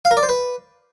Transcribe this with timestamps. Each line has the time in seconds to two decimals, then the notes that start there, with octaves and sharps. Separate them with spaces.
0.05 F5
0.11 A#4
0.17 D5
0.23 C5
0.29 B4